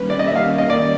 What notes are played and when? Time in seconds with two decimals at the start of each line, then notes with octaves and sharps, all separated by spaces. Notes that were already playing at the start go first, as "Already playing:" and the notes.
Already playing: D#3 G3 A#3 C#4 B4
0.10 D5
0.19 D#5
0.27 E5
0.36 F5
0.58 D#5
0.70 D5